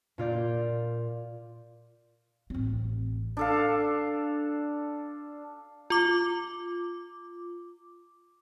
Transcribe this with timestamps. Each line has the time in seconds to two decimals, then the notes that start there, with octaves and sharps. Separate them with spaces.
0.18 A#2 F4 D5 G6
2.50 A1 C4
3.37 D4 A4 F5
5.90 F4 D6